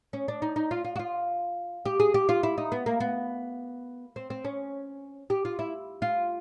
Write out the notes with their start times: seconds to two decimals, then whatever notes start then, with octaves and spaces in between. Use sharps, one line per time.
0.13 C#4
0.28 D4
0.42 D#4
0.56 D#4
0.71 F4
0.85 F4
0.96 F#4
0.99 F4
1.85 G4
2.00 G#4
2.14 G4
2.29 F4
2.43 E4
2.58 D#4
2.72 B3
2.86 A#3
3.00 B3
4.16 C4
4.30 C4
4.45 C#4
5.30 G4
5.45 F4
5.59 E4
6.02 F4